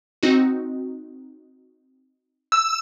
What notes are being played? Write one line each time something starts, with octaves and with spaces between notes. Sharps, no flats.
C4 D#4 F#4
E6